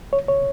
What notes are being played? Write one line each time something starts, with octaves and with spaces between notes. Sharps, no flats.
C#5
C#5